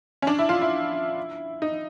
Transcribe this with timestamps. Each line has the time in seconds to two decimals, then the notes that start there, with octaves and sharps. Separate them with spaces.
0.22 C#4
0.27 D4
0.39 E4
0.49 F4
0.61 E4
1.62 D#4